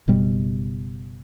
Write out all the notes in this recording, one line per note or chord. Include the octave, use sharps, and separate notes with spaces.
F#1 B2 G3